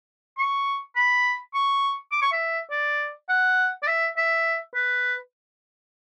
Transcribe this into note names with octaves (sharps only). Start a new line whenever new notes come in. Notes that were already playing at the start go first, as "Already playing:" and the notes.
C#6
B5
C#6
D6
C#6
E5
D5
F#5
D5
E5
E5
B4